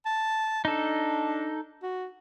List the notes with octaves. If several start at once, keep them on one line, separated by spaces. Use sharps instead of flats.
A5
D4 D#4 A4
F#4